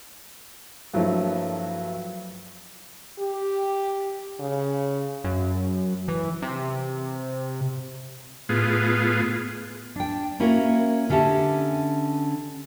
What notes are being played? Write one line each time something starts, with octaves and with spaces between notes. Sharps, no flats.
G2 F3 F#3 A3 A#3 E4
G4
C#3
F#2
E3
C3
A2 B3 F4 G#4
D4 G5
A#3 C#4 E4 F#4 A#4
D3 C#4 G4 E5 A5